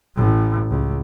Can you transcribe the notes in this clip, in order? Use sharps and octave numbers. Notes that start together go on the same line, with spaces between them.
A1 A2
C#2